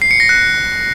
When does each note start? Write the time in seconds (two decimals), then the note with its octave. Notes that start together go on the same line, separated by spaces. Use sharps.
0.02 C7
0.11 C#7
0.20 A#6
0.29 F#6